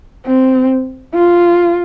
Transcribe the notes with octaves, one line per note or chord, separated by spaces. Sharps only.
C4
F4